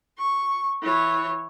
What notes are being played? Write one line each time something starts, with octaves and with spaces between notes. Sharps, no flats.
C#6
E3 C#5